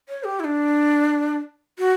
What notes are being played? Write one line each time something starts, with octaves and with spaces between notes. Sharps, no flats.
C#5
G4
E4
D4
F#4